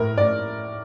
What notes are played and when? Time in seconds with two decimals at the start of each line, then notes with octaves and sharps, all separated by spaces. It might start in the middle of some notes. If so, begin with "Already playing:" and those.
Already playing: A2 A#4
0.18 A2 D5